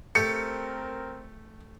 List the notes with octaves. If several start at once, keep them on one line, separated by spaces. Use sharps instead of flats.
A3 C4 G4 A4 A#4 C#7